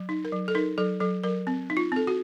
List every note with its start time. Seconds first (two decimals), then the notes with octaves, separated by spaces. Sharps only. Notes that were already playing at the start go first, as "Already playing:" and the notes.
Already playing: F#3
0.09 D#4
0.25 A#4
0.33 F#3
0.48 A4
0.55 D#4 A#4
0.78 F#3 A4
1.00 F#3 A4
1.24 F#3 A#4
1.47 C4
1.70 D#4
1.77 F4
1.92 C4 A4
2.07 F#4